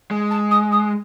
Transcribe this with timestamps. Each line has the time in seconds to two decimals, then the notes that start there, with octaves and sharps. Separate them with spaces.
0.11 G#3
0.31 A5
0.51 D#6
0.72 D#6